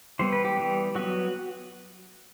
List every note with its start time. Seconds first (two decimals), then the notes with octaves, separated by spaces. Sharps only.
0.19 E3 G3 B3 C5
0.32 B4
0.45 G4
0.57 E3 G3 B3
0.95 F#3 B3 F#4